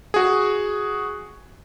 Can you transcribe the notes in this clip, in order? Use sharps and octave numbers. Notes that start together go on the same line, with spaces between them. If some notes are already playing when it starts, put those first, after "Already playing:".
F#4 G#4